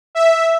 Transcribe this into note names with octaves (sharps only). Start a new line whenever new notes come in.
E5